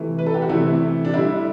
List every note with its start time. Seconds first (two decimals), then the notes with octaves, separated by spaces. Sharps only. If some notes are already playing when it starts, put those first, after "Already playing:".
Already playing: C3 E3 A3
0.19 B4
0.26 A4
0.34 G4
0.42 F#4
0.49 C3 E3 A3 E4
1.05 D4
1.13 D3 G3 E4